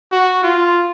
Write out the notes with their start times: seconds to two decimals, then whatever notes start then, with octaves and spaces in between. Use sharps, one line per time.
0.12 F#4
0.43 F4